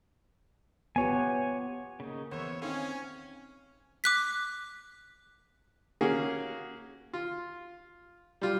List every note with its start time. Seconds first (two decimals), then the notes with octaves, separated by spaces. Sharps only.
0.96 B3 F4 G4 C#5 G#5
2.00 C#3 A#3 D#4
2.32 E2 B3 C5 C#5 E5
2.62 D#3 C4 C#4 F5 G#5
4.04 D6 F#6 B6
6.01 A#3 C#4 F#4 G#4
7.14 F4
8.42 G3 F4